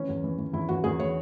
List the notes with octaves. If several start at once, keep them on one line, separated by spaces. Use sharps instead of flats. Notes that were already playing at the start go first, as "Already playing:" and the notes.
Already playing: E3 C#4
E2
E3
E3
E2 E4
E2 F#4
E2 G#4
E3 C#5